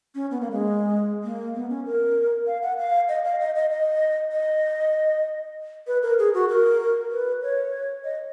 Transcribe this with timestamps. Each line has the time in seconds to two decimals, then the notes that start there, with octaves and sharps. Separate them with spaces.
0.15 C#4
0.31 B3
0.41 A#3
0.51 G#3
1.23 A#3
1.55 B3
1.70 C#4
1.86 A#4
2.47 F5
2.62 F#5
2.78 F5
3.08 D#5
3.25 F5
3.40 D#5
3.55 D#5
3.71 D#5
4.32 D#5
5.87 B4
6.03 A#4
6.19 G#4
6.34 F#4
6.49 A#4
7.11 B4
7.42 C#5
8.04 D#5